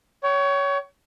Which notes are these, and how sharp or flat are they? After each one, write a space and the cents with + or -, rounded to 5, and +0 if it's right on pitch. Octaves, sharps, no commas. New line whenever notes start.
C#5 +20 G5 -40